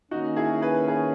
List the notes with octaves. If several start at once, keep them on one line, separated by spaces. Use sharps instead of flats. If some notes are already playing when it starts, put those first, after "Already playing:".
D#3 A#3 C#4 D#4 F#4
E4 G#4
G#4 B4
G#4 B4